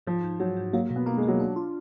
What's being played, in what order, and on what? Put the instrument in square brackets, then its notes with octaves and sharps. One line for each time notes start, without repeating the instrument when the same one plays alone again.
[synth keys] G#2 [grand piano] F3
[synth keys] G#2
[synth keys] G#2 [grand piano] F#3
[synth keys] G#2
[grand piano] F#3 [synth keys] A#3
[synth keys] B2
[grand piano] B3
[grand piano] A#3 [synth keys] D#4
[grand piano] G#3
[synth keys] A#3
[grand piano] F#3
[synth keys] D4
F4